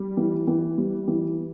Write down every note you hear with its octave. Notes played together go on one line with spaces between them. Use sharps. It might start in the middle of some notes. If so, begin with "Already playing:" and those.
Already playing: G3
E3
E3
G3
E3